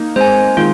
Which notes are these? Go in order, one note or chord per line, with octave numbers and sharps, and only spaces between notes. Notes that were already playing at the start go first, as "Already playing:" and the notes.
Already playing: A#3 D#4
G#3 C4 C5 G#5
D#3 G#3 F4